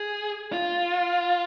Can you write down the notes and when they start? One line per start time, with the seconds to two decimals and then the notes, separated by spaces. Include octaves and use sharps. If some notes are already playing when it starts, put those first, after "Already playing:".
Already playing: G#4
0.53 F4